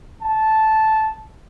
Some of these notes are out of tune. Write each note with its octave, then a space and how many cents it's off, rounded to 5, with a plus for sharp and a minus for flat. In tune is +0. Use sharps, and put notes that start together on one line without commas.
A5 -10